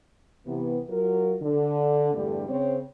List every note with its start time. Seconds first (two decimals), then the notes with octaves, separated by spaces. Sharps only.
0.47 C3 E3 B3
0.90 F#3 F4 A#4
1.42 D3
2.14 E2 G2 D3 G3 A3 G4
2.49 C#3 C4 C5 C#5